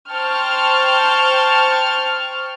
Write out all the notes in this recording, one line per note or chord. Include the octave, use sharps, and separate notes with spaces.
C5 G5 A5 C#6 F6